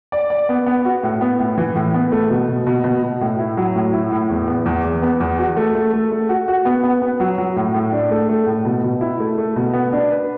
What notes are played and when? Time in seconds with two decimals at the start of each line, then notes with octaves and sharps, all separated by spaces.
0.12 D5
0.30 D5
0.49 B3
0.66 B3
0.85 F#4
1.03 A2
1.21 B3
1.39 A2
1.57 E3
1.75 A2
1.94 B3
2.12 A3
2.30 B2
2.48 B2
2.67 B2
2.84 B2
3.03 B2
3.21 A2
3.39 E4
3.57 F#3
3.76 A2
3.93 E4
4.12 A2
4.30 E2
4.48 B3
4.66 E2
4.84 E2
5.02 B3
5.20 E2
5.38 F#4
5.56 A3
5.75 A3
5.93 A3
6.11 A3
6.29 F#4
6.48 F#4
6.65 B3
6.84 B3
7.02 B3
7.20 F#3
7.38 F#3
7.56 A2
7.74 A2
7.92 D4
8.11 A3
8.29 A3
8.46 A2
8.65 B2
8.83 B2
9.01 E4
9.20 A3
9.38 A3
9.56 B2
9.73 B3
9.92 D4
10.10 B4